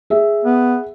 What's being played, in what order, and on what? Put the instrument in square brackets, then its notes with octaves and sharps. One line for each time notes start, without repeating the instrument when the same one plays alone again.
[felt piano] G#4 E5
[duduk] B3